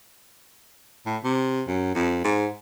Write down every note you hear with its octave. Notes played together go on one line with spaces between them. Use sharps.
A2
C3
F#2
F2
G#2